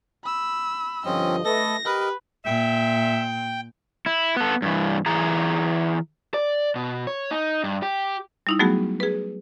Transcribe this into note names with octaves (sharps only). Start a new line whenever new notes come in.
B5 E6
G2 D3 F3 C4 C#4 D#5
A3 A4 B4 D#5 A#6
G4 A#4 B4 D#5
A#2 E5 G5
E4
B3 A4
G2 E3
E3 G#4 A#5
D5
B2
C#5
D#4
G2
G4
G3 D#4 E4
F#3 G3 A3 B3 F#4 G#4
G#4 B4